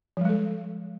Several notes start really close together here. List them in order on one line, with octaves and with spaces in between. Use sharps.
F3 G3 G#3 A4